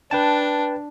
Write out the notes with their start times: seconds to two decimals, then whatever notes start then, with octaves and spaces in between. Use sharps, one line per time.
0.11 D4 B4 G5 A5